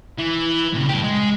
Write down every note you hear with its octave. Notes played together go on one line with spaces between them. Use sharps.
E3
A#2 C#3
G2 G4
G#3